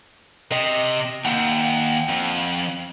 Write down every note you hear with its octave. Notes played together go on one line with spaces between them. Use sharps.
C3 D#5
D#2 F#5 G5
F2